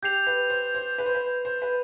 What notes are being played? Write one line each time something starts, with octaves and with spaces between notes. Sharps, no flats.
G4 G6 C7 F7
B4
C5
C5
B4
C5
B4
C5
B4